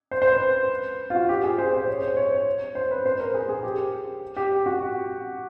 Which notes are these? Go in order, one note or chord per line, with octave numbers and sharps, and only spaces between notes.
C5
C5
B4
F4
F#4
G4
G#4
C5
C5
C#5
C5
C#5
C5
B4
C5
A#4
G#4
G#4
G4
G4
F#4